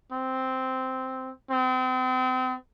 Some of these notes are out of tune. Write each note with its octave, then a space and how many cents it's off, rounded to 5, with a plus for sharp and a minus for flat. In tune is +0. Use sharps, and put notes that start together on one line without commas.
C4 -5
C4 -35